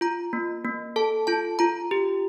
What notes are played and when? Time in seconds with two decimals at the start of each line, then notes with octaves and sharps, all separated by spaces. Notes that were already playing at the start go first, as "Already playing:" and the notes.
0.01 F4 A#5
0.33 A#3
0.65 A#3
0.96 A4 A5
1.27 F4 A5
1.59 F4 A#5
1.91 G4